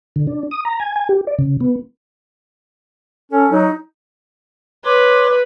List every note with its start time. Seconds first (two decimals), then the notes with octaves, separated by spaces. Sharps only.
0.16 D3
0.27 D4
0.51 D#6
0.65 A#5
0.80 G#5
0.96 G#5
1.09 G4
1.27 D5
1.39 C#3
1.61 B3
3.32 C#4 A4
3.51 F#3 D#4
4.85 B4 C#5 C6 D6